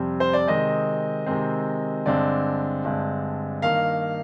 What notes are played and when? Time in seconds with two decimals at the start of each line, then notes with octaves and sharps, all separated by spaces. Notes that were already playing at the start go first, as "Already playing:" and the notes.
Already playing: F2 C3 G3 C4
0.20 C5
0.33 D5
0.47 C3 D#3 G#3 C4 D#5
1.26 C3 D#3 G#3 C4
2.06 G2 D3 G#3 C4 D5
2.84 G2 D3 G#3 C4
3.62 G2 D#3 A#3 F5